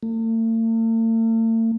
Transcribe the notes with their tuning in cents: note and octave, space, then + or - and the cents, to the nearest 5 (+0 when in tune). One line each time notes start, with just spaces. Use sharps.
A3 +45